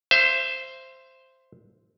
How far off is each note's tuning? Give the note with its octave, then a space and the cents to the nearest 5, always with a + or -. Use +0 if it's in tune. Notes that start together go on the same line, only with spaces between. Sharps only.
C5 +0 E5 +35